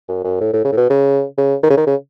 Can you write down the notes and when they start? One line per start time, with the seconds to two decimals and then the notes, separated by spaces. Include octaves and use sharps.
0.09 F#2
0.24 F#2
0.41 A2
0.54 A2
0.65 C#3
0.72 A2
0.77 B2
0.90 C#3
1.38 C#3
1.63 D#3
1.70 C#3
1.77 D#3
1.87 C#3